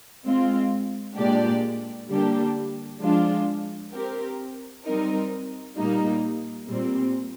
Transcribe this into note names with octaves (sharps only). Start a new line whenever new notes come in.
G#3 C4 F4
A#2 G#3 D4 G4 D5
D3 G3 A#3 D4 G4
F3 G#3 D4 F4
C4 G4 A#4
G3 C4 D#4 A#4
A#2 G3 A#3 D#4
A#2 G3 C4